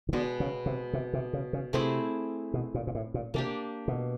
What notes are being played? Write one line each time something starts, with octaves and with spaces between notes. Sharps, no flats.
D#3
B2 D3 G#3 B3
C#3
C3
C3
C3
C#3
C#3
C3 A3 C4 E4 G#4
B2
A#2
A#2
A2
A#2
C3 A#3 D4 G4
B2